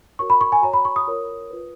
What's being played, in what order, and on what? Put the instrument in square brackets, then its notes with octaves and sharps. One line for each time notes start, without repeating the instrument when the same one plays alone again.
[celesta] F#4 A#4 C#5 C#6
B5
C#6
G#5
F#4 C#5 A#5
B5
C#6
D#6
F4 A#4 C#5
F4 B4